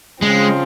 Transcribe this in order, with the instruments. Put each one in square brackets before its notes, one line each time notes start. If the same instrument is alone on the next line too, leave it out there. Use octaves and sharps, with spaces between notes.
[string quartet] C#3 F3 C4 F4 [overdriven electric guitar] G#3